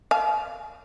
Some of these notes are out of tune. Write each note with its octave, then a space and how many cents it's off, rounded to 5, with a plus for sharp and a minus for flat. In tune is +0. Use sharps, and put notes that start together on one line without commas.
F5 -5 G#5 +45